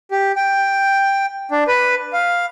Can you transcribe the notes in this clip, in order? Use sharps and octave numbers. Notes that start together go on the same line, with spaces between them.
G4
G5
D4
B4
F5